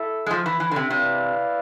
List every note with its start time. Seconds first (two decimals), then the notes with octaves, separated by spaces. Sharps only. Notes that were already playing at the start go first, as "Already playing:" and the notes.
Already playing: E4 A4 E5
0.26 G#3
0.31 F3
0.46 E3
0.60 E3
0.71 D3
0.76 C3
0.90 C3 E4 B4 D5 F5